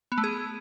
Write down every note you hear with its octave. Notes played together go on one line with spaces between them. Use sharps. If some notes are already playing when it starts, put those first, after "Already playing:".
B3
A3
G#4